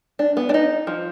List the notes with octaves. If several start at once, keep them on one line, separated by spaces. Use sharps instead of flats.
D4
B3
D4
D#4
F3